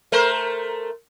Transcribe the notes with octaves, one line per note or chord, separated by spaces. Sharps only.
A3 A#4 C5